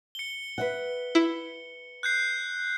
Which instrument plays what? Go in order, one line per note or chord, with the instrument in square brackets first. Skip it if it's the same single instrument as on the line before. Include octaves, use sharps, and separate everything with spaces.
[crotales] C#7 G7
[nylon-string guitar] B4 E5 F#5
[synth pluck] E4
[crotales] F#6 G6 C7